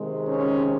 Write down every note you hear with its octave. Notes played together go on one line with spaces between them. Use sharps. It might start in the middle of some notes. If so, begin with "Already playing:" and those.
Already playing: C3 D#3 G#3
C#4